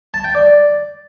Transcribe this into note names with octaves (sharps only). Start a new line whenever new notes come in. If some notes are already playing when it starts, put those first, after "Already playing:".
A5
G5
D5